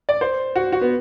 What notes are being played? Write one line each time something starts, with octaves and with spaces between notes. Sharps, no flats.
D5
C5
F#4
F#4
B3